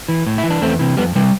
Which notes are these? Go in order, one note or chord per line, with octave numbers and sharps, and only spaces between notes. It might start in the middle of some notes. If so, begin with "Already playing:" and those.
E3
A2
E4
E3
D4
E2 A3 C4
C3 E3
F2 G3 B3
C3 E3 G3